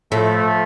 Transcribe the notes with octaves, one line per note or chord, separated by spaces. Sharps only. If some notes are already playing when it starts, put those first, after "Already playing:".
A2 F3 A3